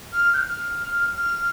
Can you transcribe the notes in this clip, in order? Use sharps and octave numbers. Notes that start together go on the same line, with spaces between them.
F6
G6
F6
F6